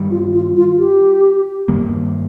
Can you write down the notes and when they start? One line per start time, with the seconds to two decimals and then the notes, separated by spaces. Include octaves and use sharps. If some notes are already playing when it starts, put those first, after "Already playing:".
Already playing: G2 D#3 G3
0.11 F4
0.33 F4
0.56 F4
0.78 G4
1.68 G2 D#3 G3 A#3